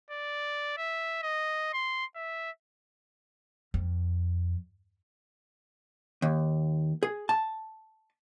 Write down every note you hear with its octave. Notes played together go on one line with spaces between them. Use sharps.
D5
E5
D#5
C6
E5
F2
D#2
G#4
A5